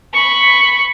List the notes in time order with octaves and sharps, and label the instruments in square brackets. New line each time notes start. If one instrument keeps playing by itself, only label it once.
[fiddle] B5 C#6